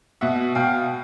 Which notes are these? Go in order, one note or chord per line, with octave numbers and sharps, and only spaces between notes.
B2 E5 F#5
B2 F5 G5